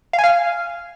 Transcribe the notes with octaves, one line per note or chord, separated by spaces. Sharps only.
F5
G#5
F5